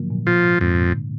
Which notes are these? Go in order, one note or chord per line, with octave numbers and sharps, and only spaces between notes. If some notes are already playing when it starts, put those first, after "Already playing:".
Already playing: G#2 D3 F3 F#3 A#3
A#2
A#2 F3
G#2
F2 G#2
A#2
D3